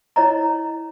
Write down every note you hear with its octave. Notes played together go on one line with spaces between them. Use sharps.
E4 C#5 D#5 A#5